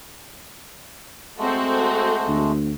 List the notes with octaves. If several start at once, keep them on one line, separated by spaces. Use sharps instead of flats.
G#3 A3 C4 F#4 A4
D2